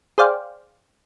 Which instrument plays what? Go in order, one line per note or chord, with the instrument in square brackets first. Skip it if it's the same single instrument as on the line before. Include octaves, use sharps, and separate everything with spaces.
[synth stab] G#4 C5 D5 F5 G5